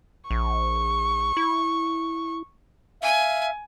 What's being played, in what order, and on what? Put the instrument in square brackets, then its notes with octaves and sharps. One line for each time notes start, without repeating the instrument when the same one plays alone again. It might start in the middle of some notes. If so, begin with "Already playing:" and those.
[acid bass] A#1 [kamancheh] C#6
[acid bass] E4
[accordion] E5 F5 [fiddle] G#5